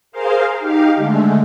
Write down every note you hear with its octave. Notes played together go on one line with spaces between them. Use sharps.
G#4 A#4 C5 F5
D#4 G4 F5
D3 G#3 A3